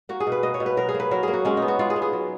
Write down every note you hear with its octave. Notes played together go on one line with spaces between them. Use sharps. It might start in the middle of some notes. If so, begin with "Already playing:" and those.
A#3 F#4
G#4
B2
B4
A#3 D#5
C#5
B2
B4
F#3 A#4
G#4
A#3
B4
F#3 A#4
A#3 G#4
F#4
G#3 C#4
D#4
B3
F#4
G#3 F4
G#4
B3
G#4
F#3